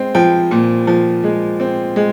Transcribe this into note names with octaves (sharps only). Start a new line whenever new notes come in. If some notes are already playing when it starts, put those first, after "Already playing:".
Already playing: G#3 C4
F3 G5
A#2
F3
G#3
C4
G#3